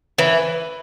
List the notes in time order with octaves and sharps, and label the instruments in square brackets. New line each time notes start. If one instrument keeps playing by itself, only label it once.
[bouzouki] E3 [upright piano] B4